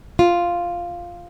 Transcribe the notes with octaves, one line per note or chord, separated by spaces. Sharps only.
F4